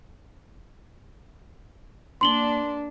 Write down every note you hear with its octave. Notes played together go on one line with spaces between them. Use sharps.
A#3 D4 C6 F#7 G7